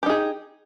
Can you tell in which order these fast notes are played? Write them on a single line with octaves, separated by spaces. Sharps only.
G4 D#4 G#4